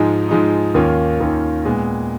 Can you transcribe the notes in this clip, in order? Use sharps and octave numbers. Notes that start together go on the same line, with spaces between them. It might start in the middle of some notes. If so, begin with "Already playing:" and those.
Already playing: G#2 F3 G#3 D#4
G#2 F3 G#3 D#4
D#2 D#3 A#3 C#4 F4
D#2 D#3 A#3 C#4 F4
A#2 G#3 B3